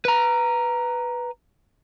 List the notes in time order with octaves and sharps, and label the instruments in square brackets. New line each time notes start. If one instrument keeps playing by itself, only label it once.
[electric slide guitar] B4 A#5